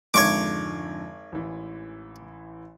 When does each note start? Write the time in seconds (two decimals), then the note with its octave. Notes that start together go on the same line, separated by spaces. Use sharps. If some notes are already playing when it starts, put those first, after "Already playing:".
0.14 G#1 F2 G#2 D3 C#5 C#6 D6
1.32 A1 E3